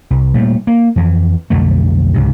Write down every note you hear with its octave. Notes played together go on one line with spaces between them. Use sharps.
C2
A#2 G3 A3
A#3
F2 E3
B1 F2 D3 A3
C#2 G#2 C3